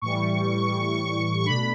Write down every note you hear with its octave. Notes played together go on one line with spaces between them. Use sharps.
A2 E3 G3 C#6
C#6
B2 A3 D4 B5